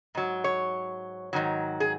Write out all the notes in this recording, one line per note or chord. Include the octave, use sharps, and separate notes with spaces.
G#2 F#3
C#5
G#2 D#3 F#3
G#4